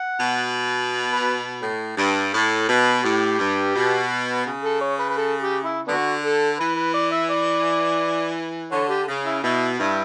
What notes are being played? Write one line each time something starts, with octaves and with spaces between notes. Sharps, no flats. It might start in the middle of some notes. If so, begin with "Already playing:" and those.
Already playing: F#5
B2
B4
A2
G2
A2
B2
A2 G4
G2
B2
C#3
A4
C#5
B4
B4
A4
G4
E4
D3 B3 D4 F#4
A4
E3 B4
B4
D5
E5
D5
D3 C#5
G4
C#3
E4
B2 E4
G2 E4